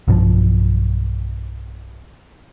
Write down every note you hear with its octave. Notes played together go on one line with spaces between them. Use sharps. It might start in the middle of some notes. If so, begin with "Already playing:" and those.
B1 G2 F3